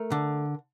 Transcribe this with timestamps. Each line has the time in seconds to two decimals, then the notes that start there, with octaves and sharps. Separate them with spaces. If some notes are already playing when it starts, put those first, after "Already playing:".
Already playing: A3 A#4
0.12 D3